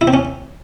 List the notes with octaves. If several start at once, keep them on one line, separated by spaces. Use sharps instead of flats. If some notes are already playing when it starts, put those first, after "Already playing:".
E4
C4
C#4